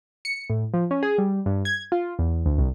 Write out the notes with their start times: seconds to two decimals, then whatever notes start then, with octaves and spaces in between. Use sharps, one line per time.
0.25 C#7
0.50 A2
0.74 F3
0.91 C#4
1.03 G#4
1.18 G3
1.46 G2
1.65 G#6
1.92 F4
2.19 E2
2.46 D2
2.58 C2